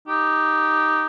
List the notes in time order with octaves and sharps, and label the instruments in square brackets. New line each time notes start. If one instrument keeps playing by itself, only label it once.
[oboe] D#4 [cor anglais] G4